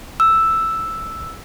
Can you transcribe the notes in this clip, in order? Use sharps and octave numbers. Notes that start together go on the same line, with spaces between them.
E6